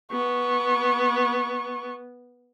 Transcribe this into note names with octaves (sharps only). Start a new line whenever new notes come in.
B3 C#6